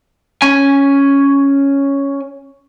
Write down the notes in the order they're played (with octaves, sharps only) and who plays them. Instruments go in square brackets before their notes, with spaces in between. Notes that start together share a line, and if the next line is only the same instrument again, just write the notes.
[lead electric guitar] C#4 G#5